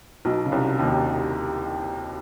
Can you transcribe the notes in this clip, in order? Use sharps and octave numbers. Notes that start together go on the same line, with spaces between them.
B1 B2
C#3
C2 C3
D#2 D#3